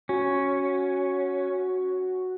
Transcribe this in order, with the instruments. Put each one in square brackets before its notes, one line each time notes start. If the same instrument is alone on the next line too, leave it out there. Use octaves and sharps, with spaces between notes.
[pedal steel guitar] C#4 [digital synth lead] F#4